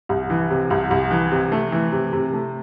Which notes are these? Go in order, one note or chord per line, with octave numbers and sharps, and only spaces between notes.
C2
E3
C3
C2
C2
E3
C3
A3
E3
C3
C3
A3